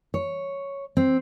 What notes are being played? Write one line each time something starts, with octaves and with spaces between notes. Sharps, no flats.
C#5
C4